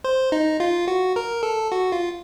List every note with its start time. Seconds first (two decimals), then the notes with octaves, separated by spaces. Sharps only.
0.04 C5
0.32 D#4
0.60 F4
0.88 F#4
1.16 A#4
1.43 A4
1.72 F#4
1.92 F4